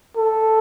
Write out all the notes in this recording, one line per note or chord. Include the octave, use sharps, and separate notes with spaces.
A4